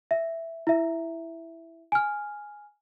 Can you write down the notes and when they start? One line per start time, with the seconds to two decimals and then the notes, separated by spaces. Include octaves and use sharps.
0.11 E5
0.67 E4 E5
1.92 G#5 F6